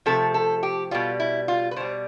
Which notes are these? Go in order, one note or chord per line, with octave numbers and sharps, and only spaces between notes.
C3 F3 A3 A4
A4
G4
B2 G3 F4
E4
F4
B4
B2 G3 C5